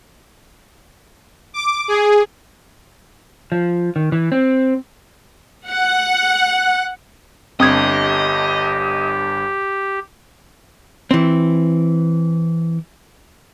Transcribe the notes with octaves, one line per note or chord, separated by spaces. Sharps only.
D6
G#4
F3
D#3
E3
C4
F#5
G1 G2 C4 G4 D#5 D#6 G#6
E3 C4